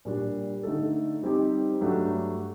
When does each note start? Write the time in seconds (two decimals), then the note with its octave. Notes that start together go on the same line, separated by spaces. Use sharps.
0.05 A#2 G3 D4
0.63 D3 A3 D#4 A4
1.23 G3 C4 D#4 G4
1.81 G2 F#3 A3 D4 G4